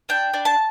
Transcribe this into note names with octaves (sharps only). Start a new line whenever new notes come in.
D4 G5
D4
A5